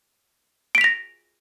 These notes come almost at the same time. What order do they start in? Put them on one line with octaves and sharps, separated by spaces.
D7 B6 F7 A#6